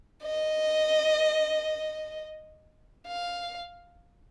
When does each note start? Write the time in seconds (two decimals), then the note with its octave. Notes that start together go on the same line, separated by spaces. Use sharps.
0.23 D#5
3.07 F5